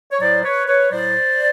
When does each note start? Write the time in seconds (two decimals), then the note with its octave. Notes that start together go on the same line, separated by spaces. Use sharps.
0.12 C#5
0.20 A2 F#3 C5 D5
0.44 B4 C#5
0.67 B4 C#5
0.91 A2 F#3 C5 D5